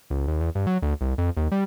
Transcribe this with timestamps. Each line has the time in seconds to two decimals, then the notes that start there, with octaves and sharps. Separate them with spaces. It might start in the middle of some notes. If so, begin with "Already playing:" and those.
0.10 C#2
0.27 D#2
0.41 E2
0.55 G2
0.67 F#3
0.82 D2
1.01 C2
1.18 F2
1.37 D#2
1.52 G3